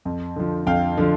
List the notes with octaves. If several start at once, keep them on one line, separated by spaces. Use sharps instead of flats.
F2
D3 F3
F2 F5 G5
D3 F3